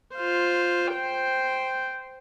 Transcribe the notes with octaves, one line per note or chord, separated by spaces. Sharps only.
F4 C5
C5 G5